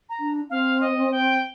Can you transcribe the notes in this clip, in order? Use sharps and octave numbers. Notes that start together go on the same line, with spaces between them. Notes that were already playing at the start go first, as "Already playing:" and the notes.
A#5
D4
C4 F5
D#5
G5